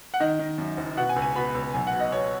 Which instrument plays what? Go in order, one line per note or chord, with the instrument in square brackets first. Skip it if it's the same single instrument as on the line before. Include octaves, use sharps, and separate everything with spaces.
[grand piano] F#5
D#3 D#5
D#3
F#2
F#1
B2 F#5
G#5
C#2
G#5
B2 B5
C#2
B1 G#5
F#5
B2
D#5
B2 C#5